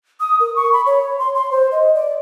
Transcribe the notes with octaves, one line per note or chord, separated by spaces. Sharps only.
D#6
A#4
C#6
B5
C#5
C6
C6
C5
D#5
D5